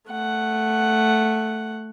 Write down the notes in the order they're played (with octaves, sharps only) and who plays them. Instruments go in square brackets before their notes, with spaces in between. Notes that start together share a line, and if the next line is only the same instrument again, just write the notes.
[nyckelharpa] A3 F#5